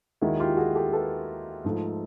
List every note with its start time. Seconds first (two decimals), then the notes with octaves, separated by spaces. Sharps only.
0.21 D#2 D#3 G#3 E4 F#4
0.40 F4 G4
0.57 F#4 G#4
0.75 G4 A4
0.93 A4 B4
1.64 G#2 F3 A3